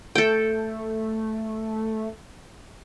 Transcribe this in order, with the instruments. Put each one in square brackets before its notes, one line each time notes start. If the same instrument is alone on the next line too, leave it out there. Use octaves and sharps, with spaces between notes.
[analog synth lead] A3 [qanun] A4 G5